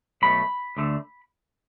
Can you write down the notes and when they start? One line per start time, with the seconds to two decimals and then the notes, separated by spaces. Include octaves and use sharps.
0.22 B1 B2 A3 B5
0.77 D2 D3 A3